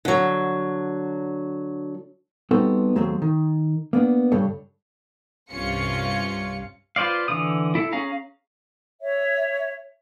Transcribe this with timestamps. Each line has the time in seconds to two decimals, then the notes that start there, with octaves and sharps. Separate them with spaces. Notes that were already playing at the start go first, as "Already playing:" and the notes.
0.05 D3 F#3
2.51 G3 B3 C4 D#4 F#4 A4
2.95 D#2 F#3 G#3 A3 C4
3.22 D#3
3.93 A#3 B3 D4
4.32 G2 C#3 G3 D4 A4 C#5
5.51 C2 G2 C3 C#4 F4 C#7
6.96 F4 B4 C5 D5 F5
7.28 D3 E3 D#6
7.75 E4 A4
7.92 C#4 G#4 F5 A#5
9.02 C#5 E5